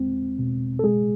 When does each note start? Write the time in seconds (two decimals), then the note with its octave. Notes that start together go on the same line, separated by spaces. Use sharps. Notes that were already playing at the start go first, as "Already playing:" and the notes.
Already playing: E2 G#3 C4
0.39 B2
0.79 A4
0.84 G#3 G#4